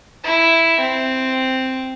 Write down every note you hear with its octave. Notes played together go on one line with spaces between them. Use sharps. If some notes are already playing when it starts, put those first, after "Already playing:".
E4
C4